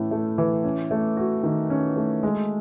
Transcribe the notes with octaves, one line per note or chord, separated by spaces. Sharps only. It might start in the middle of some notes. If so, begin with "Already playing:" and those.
Already playing: A2 E3 A3 C#4
A3
E3
C#4
A3
F#4
D#3
C#4
A3
G#3